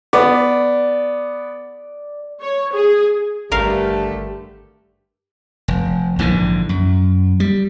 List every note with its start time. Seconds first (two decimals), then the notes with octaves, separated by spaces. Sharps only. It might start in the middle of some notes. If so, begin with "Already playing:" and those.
0.13 B3 D5
2.40 C#5
2.72 G#4
3.52 G#1 G2 D3 A3 G4 A#4 F5
5.68 F1
6.19 A#1 G#2 D3 E3
6.69 F#2
7.40 G3